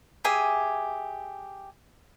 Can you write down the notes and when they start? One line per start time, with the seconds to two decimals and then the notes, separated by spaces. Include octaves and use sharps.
0.24 G4 G#4 E5 G#5